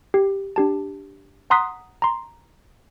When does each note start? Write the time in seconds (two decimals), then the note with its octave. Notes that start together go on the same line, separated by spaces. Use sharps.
0.14 G4
0.56 D4 G4 A5
1.50 F#5 A#5 C6 D#6 F#6 B6
2.02 A#5 C6